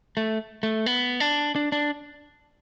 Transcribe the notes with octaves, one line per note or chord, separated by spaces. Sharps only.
A3
A3
B3
D4
D4
D4